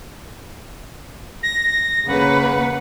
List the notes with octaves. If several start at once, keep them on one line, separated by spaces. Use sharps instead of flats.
A#6
C#3 A#3 B4 F#5